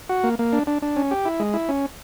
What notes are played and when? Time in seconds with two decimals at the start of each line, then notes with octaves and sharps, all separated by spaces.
0.09 F#4
0.24 A#3
0.39 A#3
0.53 D4
0.67 D4
0.82 D4
0.96 C#4
1.11 G4
1.25 E4
1.40 G#3
1.54 E4
1.69 C#4